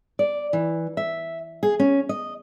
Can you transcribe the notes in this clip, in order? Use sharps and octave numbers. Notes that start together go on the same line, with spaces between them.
D5
E3
E5
G#4
C#4
D#5